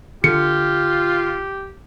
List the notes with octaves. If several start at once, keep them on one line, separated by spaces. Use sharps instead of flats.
D3 F4 G4 C#7